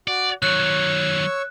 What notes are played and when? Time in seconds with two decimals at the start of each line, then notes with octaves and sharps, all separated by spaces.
0.08 F#4 D5
0.42 D#3 F#3 C#5 C#6 E6 F#6